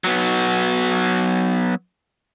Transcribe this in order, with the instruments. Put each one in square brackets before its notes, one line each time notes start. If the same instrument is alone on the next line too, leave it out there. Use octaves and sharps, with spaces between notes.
[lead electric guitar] F#3 B3